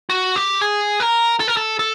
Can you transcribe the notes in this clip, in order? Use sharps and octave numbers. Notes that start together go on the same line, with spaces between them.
F#4
G4
G#4
A#4
A4
A#4
A4
A4